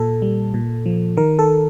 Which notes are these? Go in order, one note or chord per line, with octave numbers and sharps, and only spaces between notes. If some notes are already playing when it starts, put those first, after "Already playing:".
Already playing: A#2 A4
G3
A#2
F3
D#3 A#4
A4